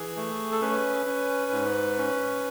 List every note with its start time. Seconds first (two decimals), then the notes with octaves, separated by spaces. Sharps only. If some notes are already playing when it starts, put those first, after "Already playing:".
Already playing: E3 G#4
0.16 A3
0.52 A4
0.62 C#4 B4
1.06 C#4
1.52 G#2
1.98 C#4